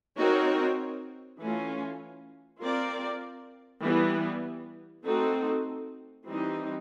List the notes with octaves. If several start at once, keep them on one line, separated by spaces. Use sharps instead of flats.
C4 D#4 F#4 A#4 C#5
E3 A3 C#4 F4
C4 F4 A#4 D5
E3 G3 B3
A3 C4 D#4 F#4 A4
E3 G3 C4 D#4